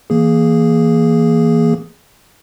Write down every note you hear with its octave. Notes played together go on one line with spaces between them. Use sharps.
E3 A#3 G#4